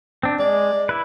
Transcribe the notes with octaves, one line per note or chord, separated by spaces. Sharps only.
C4 D4
G#3 D5
E4 B4